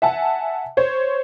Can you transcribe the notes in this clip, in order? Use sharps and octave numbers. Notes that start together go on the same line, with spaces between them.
E5 F#5 G#5 A5
C5 C#5